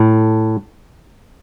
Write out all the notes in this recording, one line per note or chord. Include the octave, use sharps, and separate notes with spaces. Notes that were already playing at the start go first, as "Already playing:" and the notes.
Already playing: A2